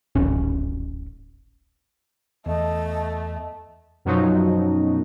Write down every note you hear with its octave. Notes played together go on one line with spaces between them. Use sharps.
D1 G#1 C#4
E2 A3 D#5
F#2 B2 F3 F#3 D#4